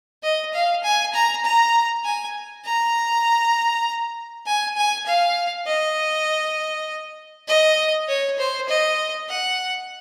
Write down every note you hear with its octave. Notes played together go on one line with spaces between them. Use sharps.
D#5
F5
G#5
A#5
A#5
G#5
A#5
G#5
G#5
F5
D#5
D#5
C#5
C5
D#5
F#5